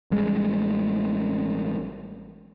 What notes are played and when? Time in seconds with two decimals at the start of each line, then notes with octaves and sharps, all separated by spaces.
0.11 A1 G3 G#3